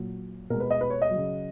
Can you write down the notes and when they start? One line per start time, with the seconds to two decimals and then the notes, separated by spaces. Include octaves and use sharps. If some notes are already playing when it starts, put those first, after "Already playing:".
Already playing: A#2 F#3
0.50 B2 G#3 A#4
0.60 B4
0.71 D#5
0.81 B4
0.90 C#5
1.02 D#5
1.11 F#3
1.16 C#3